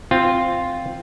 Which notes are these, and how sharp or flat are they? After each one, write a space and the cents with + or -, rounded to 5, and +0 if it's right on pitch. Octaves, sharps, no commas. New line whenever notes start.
C4 +0 F4 +0